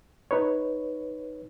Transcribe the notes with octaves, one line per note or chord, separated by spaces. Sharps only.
D#4 B4 C#5